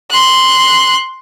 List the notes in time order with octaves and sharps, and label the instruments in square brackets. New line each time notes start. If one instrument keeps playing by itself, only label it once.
[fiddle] C6 F#6